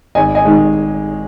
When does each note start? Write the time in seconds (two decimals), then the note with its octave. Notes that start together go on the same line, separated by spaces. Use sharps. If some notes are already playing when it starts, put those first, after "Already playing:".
0.15 G#1 D#5 G#5
0.35 D#5 G#5
0.45 D#3 G#3